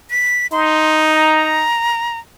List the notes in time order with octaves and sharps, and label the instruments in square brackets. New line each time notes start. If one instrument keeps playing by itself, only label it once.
[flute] B6
[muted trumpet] D#4 [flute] C6
[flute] A#5